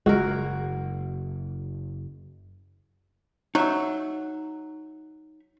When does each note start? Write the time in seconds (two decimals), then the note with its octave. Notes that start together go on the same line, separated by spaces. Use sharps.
0.06 F#1 G#3 F#4 A#4
3.55 F#3 D#4 E5